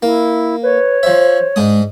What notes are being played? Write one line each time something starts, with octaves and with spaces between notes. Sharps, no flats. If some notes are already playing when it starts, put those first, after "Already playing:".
A#3 E4
B4 C#5
F3 C5 E5
G#2 G#3 D4 D#6